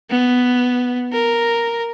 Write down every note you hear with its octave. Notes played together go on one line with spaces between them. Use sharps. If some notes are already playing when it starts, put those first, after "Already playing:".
B3
A#4